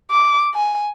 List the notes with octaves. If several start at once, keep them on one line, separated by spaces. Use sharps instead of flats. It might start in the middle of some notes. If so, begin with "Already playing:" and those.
D6
G#5